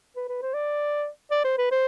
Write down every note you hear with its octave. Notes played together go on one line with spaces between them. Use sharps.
B4
B4
C5
D5
D5
C5
B4
C5